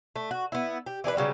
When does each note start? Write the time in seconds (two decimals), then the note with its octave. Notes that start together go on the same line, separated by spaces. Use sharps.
0.16 A3
0.31 F#4
0.52 B3 E4
0.86 G4
1.04 E3 D4 G#4 B4
1.16 C#3 F#3 G3 B3